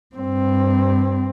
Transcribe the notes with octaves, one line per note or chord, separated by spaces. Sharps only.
G2 C4